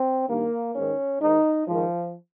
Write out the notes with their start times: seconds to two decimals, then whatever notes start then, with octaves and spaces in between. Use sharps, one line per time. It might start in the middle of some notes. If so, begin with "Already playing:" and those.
Already playing: C4
0.28 G2 D#3 A#3
0.74 G#2 D#3 C#4
1.20 G#2 D#3 D#4
1.67 G#2 D#3 F3